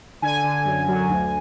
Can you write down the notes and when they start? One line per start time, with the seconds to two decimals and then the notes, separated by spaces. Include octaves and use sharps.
0.22 D3 G#5
0.44 D3
0.65 F#2
0.88 F#3
1.09 D2